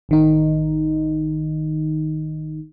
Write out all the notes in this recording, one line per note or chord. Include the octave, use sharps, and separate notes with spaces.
A1 D#3 D#4